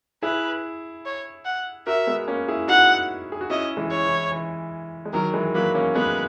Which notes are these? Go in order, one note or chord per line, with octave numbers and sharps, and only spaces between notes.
E4 G#4 B4
C#5
F#5
F#4 A#4 E5
G#3 B3
A#3 C#4
E4 G#4
D#4 F#4 F#5
G#4
F#4
C#4 E4 D#5
E3 G#3
C#5
E3
E3
G#3
D#3 F#3 A#4
E3 G#3
F#3 A#3 B4
A#3 C#4
G#3 B3 B4